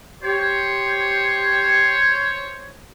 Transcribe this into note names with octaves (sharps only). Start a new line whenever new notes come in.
G4 C5 C#5